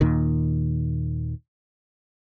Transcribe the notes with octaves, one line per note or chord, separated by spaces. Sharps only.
D#2 A#2 D#3